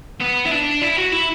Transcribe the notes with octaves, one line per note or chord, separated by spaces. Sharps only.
B3
E4
D4
E4
F#4
E4